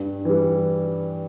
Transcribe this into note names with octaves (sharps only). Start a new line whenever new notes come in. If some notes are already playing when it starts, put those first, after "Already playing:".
Already playing: G2
E3 G3